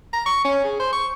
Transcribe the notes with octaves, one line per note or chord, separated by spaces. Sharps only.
A#5
C#6
C#4
G#4
C5
C#6